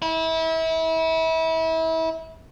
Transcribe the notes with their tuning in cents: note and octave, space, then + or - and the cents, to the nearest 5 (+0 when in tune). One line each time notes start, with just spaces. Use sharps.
E4 -30